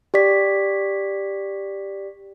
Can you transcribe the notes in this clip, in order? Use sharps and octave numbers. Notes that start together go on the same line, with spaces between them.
G4 D5 B6